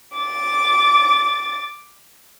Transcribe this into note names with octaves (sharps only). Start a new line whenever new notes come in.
D6 A6